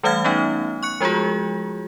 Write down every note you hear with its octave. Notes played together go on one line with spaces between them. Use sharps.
E3 G3 A3 F5 F6 G#6
A3 B3 C#4 D#4
C#6 F#6 C#7
F3 G#3 F4 F#4 G#4